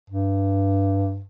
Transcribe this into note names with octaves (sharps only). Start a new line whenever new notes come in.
G2